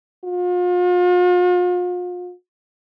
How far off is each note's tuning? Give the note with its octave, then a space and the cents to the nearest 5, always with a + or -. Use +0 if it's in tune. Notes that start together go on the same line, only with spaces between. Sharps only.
F4 +40